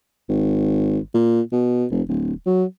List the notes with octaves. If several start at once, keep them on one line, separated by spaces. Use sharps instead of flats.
G#1
A#2
B2
F1
D1
F#3